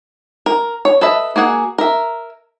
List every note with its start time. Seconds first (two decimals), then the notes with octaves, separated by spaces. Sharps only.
0.46 A#4
0.85 C#5
1.01 A4 B4 D#5 E5
1.36 A#3 F#4 G#4 F#5
1.78 A#4 E5